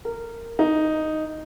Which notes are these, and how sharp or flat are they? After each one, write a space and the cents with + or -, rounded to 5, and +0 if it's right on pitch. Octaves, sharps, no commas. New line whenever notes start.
A#4 -15
D#4 +0